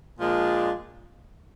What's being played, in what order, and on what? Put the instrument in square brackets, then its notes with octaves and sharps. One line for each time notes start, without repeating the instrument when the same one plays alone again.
[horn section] A#2 F3 G#3 D4